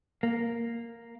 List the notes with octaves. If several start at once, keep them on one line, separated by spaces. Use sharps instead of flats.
A#3